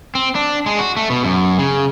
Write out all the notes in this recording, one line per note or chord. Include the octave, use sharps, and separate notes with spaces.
C4
D4
G#3
F#4
A3
B2
F#2
C#3